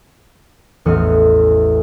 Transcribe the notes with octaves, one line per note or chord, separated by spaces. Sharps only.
A1 E2 D#5 F6 C#7 D#7